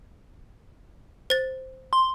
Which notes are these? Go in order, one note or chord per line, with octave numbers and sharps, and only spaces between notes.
C5 A6
C6